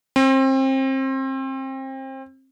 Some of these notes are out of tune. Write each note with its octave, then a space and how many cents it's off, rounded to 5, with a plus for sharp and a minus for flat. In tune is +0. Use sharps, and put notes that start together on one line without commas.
C4 +30